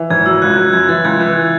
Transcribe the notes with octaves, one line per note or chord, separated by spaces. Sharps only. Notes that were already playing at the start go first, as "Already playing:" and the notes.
Already playing: E3
G#1 G#6
F#3 E6
C#2 F#6
F#3 G#6
F#2 G#6
E3 A6
C#2 G#6
E3 F#6